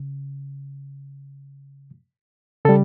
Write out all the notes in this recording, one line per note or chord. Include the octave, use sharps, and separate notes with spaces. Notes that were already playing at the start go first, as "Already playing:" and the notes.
Already playing: C#3
C#3 G3 A4